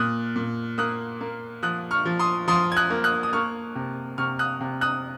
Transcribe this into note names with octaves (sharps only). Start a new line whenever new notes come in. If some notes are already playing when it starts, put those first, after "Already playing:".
Already playing: A#2 D#6 F#6
A#2
A#3 D#6 F#6
A#3
F3 D#6 F#6
C#6 F6
F3
C6 D#6
F3 C6 D#6
G#6
D#6 F#6
A#3
D#6 F#6
D#6
A#3 C#6 F6
C3
C3 C#6 F6
D#6 F#6
C3
D#6 F#6